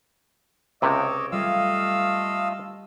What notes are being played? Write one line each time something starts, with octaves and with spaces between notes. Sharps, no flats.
C#2 C3 C#5 D#5 D6 E6
G3 A3 F4 D#5 F5 E6